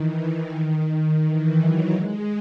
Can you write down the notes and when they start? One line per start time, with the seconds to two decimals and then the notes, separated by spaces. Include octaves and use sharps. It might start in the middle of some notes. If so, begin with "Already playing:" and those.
Already playing: D#3 E3
0.22 D#3
1.25 E3
1.59 F#3
1.93 G#3